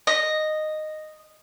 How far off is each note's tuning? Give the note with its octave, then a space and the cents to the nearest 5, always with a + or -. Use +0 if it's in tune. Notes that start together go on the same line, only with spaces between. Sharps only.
D#5 -10